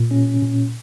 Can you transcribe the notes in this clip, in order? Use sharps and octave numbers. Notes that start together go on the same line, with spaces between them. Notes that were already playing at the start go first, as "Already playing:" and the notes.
Already playing: A#2
C#4
A#2